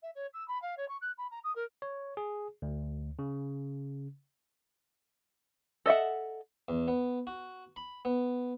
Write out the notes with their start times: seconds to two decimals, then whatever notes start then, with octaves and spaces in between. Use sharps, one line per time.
0.02 E5
0.15 C#5
0.33 E6
0.48 B5
0.61 F5
0.77 C#5
0.88 C#6
1.01 F#6
1.18 B5
1.30 A#5
1.44 D#6
1.55 A#4
1.82 C#5
2.17 G#4
2.62 D2
3.19 C#3
5.86 A4 D#5 E5 F#5
6.68 E2
6.88 B3
7.27 F#4
7.76 B5
8.05 B3